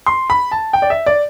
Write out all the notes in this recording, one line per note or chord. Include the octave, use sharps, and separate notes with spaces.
C6
B5
A5
G5
D5
E5
D5